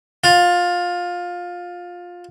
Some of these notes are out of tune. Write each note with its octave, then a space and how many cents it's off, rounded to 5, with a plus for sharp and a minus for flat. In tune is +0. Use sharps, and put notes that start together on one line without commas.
F4 +15